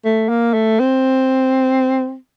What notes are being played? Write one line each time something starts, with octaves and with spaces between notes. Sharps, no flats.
A3
A#3
A3
C4